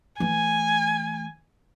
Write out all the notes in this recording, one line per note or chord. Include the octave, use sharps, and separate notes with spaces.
E3 A3 G#5